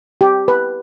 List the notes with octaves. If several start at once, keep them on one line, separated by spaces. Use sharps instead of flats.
G4
B4